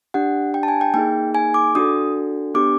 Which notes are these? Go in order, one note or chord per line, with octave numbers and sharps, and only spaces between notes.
D4 G4 F#5
G5
A5
G#5
G5
A#3 D#4 G#4 G5
G#5
D6
D4 F#4 A4 D#6
B3 D4 G4 D6